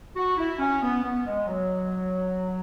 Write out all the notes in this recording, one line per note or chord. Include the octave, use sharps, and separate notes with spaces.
F#4
E4
C#4
B3
B3
G#3
F#3